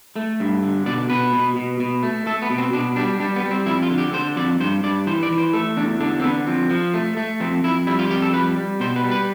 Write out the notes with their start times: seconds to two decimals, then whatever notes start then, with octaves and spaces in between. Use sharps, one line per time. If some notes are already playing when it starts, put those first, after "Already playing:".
0.16 A3
0.40 G2
0.63 D3
0.86 B2 D5
1.10 B2 B4
1.33 B2
1.56 B2
1.80 B2
2.03 A3
2.26 A3 A4
2.42 B3
2.50 B2
2.58 C4
2.73 B2 D4
2.96 G3 D4
3.20 G3 D4
3.36 B3
3.43 G3
3.51 C4
3.66 F2 E4
3.82 F4
3.90 D3
3.98 G4
4.13 D3 C5
4.36 F2 D5
4.60 G2 C5
4.84 G2 D5
5.06 E3 C5
5.23 D5
5.30 E3
5.38 C5
5.53 A3 A4
5.77 E2 D4
6.00 D3 D4
6.20 C4
6.23 D3 B3
6.47 F3 C4
6.70 F3
6.94 A3
7.17 A3
7.40 F2 C4
7.64 F2 E4
7.87 G3 E4
7.99 F4
8.10 F2 G4
8.22 A4
8.33 G3 B4
8.58 G3
8.80 B2 C5
8.96 B4
9.04 G3
9.11 B4